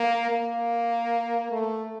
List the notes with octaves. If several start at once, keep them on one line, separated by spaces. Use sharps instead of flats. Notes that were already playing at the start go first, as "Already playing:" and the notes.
Already playing: A#3
A#3
A3